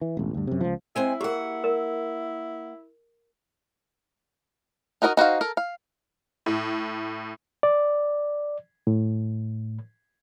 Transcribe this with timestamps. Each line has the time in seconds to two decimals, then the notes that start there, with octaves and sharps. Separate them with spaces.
0.01 E3
0.17 E1 A1
0.34 D2 G2
0.47 F#2 C3
0.61 C#2 F3
0.96 G#3 C4 E4 G#5
1.21 A#3 G4 G#4 A#4 F#5
1.64 A#4
5.02 D#4 F#4 A#4 D5 D#5
5.17 D#4 F#4 C5 F5
5.41 A4 A#4
5.57 F5
6.46 A2
7.63 D5
8.87 A2